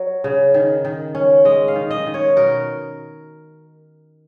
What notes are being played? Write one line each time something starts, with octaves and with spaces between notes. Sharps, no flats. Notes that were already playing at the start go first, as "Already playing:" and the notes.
Already playing: F#3
C#3
D#3
D#3
C#4
G#3 D#5
F5
D#3
D#5
D#3
C#5
B2 A#4